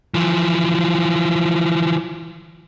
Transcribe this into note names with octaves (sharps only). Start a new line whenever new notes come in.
E3 F3